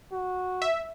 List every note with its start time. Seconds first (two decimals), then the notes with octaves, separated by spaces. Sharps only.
0.12 F#4
0.62 E5